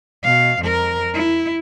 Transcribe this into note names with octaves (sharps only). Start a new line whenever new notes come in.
B2 F5
F2 A#4
E4